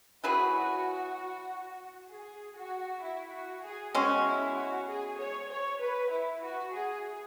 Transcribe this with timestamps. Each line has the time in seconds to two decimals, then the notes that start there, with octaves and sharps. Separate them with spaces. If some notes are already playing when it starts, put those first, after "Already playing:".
0.24 F#3 E4 F#4 G#4 B4
2.10 G#4
2.56 F#4
3.02 E4
3.32 F#4
3.63 G#4
3.94 B2 G#3 C#4 F#4
4.25 E4
4.56 F#4
4.87 G#4
5.18 C#5
5.49 C#5
5.80 B4
6.10 E4
6.41 F#4
6.73 G#4